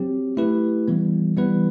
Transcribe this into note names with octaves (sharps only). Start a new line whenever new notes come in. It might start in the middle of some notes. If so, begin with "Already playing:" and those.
Already playing: F#3 C4 G4
A3 E4 G4 B4
E3 G3 B3
E3 G3 B3 E4 B4